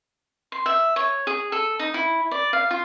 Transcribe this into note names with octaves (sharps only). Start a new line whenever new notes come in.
C6
E5
C#5
G#4
A4
D#4
E4
D5
F5
F4